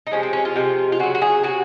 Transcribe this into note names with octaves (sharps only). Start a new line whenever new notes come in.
D#4
C3 F3 G#3 C#4
C4
C#4
F4
C3 F3 G#3
F4
C#3 F#3 F#4
F#4
G#4
C3 F#3 F#4